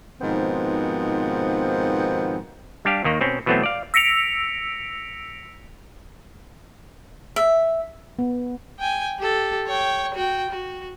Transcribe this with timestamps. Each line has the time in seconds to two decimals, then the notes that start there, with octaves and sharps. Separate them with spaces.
0.20 G#2 B2 D#3 F3 B3 C4
2.85 G3 D4 G4 F5
3.04 D#2 D#3 A#3
3.21 B2 C4 C#4
3.46 B2 E3 F#3 A3 B3 C4
3.63 D5 F5
3.94 E6 A#6 B6 C#7 D7 F7
7.36 E5
8.19 B3
8.79 G5 G#5
9.19 G4 A4
9.68 C#5 G5
10.15 F#4 G5
10.50 F#4